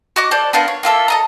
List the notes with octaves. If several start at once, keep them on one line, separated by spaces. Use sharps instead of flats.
F#4 D#5 D6
A4 C5 D5
B3 D4 F4 A#4
C#5
A#3 F4 A4 E5
A4 D#5 A#5